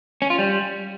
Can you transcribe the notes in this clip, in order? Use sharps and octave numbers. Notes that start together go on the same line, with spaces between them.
C#4
F4
G3